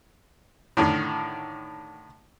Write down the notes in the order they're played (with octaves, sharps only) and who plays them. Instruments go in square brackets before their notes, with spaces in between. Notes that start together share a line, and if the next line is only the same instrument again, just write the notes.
[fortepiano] A2 D3 D#3